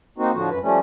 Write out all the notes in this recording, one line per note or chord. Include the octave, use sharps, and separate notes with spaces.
A#3 C4 D#4 F#4
A2 D3 F3 F#4
F#2 B4
F3 G3 A3 C#4